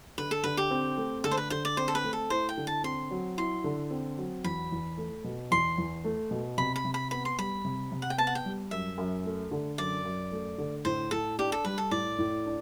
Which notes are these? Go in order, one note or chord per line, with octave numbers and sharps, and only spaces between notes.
D3 B4
A4
D3 B4
G4
C4
A3
D3 A4
C5
B4
D3 C5
D5
C4 C5
A4
B4
A3
A4
E4 C5
G5
D3
A5
C4 C6
F#3
E4 C6
D3
C4
F#3
E2 B5
E2
A3
B2
E2 C6
E2
A3
B2
C3 B5
B5
C3
B5
B3 B5
C6
G3 B5
C3
C3
F#5
G5
B3 A5
F#5
G5
G3
F#2 E5
F#2
A3
D3
F#2 D5
F#2
A3
D3
A2 C5
A2 A4
D4 G4
A4
G3 B4
A4
A2 D5
A2
D4